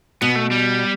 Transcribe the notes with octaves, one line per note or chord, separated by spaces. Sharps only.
B2 B3
A3
G3